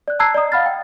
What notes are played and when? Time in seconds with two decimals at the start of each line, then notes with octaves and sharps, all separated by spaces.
0.08 D5 F#6
0.19 A5 A#5 E6 F#6 G#6 C7
0.34 D5 D#5 A#5 D#6
0.52 F5 F#5 B5 F6 A6
0.66 G5